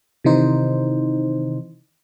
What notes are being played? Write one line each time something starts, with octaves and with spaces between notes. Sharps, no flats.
C3 D#3 E3 D#4 C5